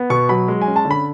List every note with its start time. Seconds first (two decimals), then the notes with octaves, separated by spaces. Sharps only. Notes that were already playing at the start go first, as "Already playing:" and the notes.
Already playing: B3
0.10 B2 C#6
0.29 F#3 B5
0.48 G#3
0.61 G#5
0.67 C#4
0.76 A5
0.85 D3
0.91 B5